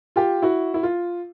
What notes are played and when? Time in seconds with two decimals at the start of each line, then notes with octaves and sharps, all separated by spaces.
0.16 F4 G4
0.42 E4 F#4
0.74 E4
0.83 F4